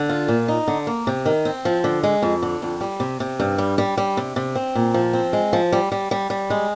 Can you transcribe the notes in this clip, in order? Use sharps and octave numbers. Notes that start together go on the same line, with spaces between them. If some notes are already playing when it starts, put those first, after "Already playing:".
Already playing: D3
F4
A#2
D#4
D3
A#3
C3
D#3
C4
F3
D3
G#3
F2
D3
F2
G3
C3
C3
G2
G3
G3
G3
C3
C3
C4
A#2
F3
C4
G#3
F3
G3
G3
G3
G3
G#3